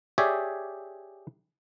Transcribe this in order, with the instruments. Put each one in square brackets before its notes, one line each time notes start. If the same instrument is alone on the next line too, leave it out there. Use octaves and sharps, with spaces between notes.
[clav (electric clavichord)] G4 G#4 C#5 D5 E5